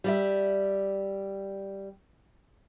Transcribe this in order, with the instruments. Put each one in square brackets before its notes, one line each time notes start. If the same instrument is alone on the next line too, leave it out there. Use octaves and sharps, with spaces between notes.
[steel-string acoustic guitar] G3 D5 E5